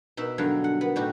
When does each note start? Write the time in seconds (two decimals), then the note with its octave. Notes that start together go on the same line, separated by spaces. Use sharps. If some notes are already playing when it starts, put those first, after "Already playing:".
0.17 B2 D#4 E5
0.38 G2 D3 F#3 D#4 F5 B5
0.64 F#5
0.81 B3
0.96 A2 G3 D#4 F#4 G4